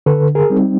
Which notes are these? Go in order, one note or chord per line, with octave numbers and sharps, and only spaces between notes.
D3 A4 B4
G#4 A#4
G3 C4 D#4